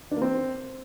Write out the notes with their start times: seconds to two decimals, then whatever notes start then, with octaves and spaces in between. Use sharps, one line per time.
0.11 D4
0.17 A#3
0.22 C4